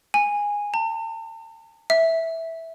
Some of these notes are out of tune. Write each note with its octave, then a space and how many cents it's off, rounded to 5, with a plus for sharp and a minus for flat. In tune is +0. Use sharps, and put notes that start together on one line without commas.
G#5 -15
A5 +45
E5 -10